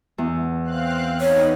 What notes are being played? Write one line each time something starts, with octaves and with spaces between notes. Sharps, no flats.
E2
C4 F5 F#6
B3 D#4 C#5